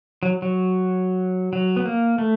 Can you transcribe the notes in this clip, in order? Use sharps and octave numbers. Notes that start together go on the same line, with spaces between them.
F#3
F#3
F#3
B3
A#3
A3